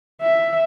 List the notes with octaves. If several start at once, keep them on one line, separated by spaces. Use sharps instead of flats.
E5